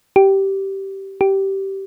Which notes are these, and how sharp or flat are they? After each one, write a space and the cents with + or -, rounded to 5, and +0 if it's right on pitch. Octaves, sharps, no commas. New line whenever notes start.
G4 -15
G4 -15